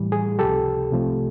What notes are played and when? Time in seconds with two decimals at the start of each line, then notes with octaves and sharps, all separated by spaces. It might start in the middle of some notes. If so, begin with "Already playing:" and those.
Already playing: A2 E3 G3
0.12 G#4
0.39 C#2 C3 F3 G4 A4
0.91 C2 C3 F3 A3